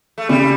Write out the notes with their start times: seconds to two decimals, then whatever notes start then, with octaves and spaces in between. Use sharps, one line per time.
0.18 A3
0.29 C#3 G3